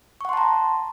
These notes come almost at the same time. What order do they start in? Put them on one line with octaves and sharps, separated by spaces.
C#6 F#5 C6 A5 A#5